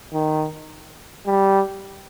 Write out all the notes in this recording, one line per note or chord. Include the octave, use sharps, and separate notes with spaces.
D#3
G3